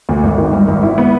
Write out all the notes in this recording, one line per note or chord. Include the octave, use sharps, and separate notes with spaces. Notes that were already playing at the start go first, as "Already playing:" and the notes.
D2
G#1
D#3
G2
G#1
E4
B3